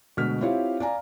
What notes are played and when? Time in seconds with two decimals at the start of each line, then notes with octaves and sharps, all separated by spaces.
0.17 D2 B2 G#3 F6 B6
0.41 C4 E4 F4 G4 C#5 F5
0.80 D5 F5 G#5 A#5